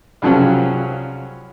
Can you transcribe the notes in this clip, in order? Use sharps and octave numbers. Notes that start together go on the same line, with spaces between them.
C2 C#3 F3 F#3 C#4